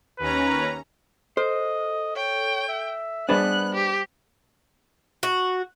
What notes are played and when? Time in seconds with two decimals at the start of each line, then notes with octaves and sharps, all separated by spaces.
0.19 D#2 C#4 B4 A#5
1.37 A4 C5 D#5
2.16 C#5 G5
2.69 E5
3.29 G3 B3 D4 G#4 B4 C5 F#6
3.75 G4
5.23 F#4